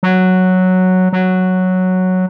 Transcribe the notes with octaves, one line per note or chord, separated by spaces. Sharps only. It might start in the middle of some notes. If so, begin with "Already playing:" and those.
F#3
F#3